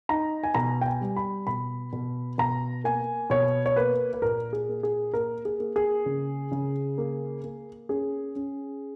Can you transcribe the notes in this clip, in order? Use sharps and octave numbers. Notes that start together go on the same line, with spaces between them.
D#4 A#5
G#5
B2 A#5
G5
G#5
G3
B5
B2 B5
B2
B2 A#5
A#3 G#5
B2 C#5
C#5
A#3 B4
B4
A#2 A#4
G#4
A#3
G#4
A#3 A#4
G#4
A#3
G#4
C#3
C#3
A#3
A#3
C#4 G#4
C#4